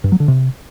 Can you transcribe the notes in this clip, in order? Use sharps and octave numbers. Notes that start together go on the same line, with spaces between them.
G2
F#3
D3
C3